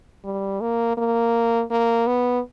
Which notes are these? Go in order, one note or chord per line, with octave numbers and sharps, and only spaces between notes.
G3
A#3
A#3
A#3
B3